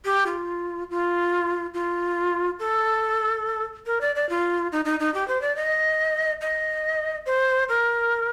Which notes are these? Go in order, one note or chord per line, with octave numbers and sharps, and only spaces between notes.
G4
F4
F4
F4
A4
A#4
D5
D5
F4
D#4
D#4
D#4
G4
C5
D5
D#5
D#5
C5
A#4